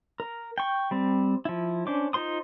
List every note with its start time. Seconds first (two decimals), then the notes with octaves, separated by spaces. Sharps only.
0.20 A#4
0.58 G5 C#6
0.91 G3 C4
1.45 F3 E4
1.87 C#4 D4 C5 D6
2.13 D#4 F4 C5 C6 D#6